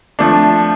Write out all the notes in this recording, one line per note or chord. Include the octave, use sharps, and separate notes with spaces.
F3 A3 D4